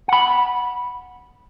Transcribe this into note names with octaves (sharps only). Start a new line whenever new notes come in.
F#5 B5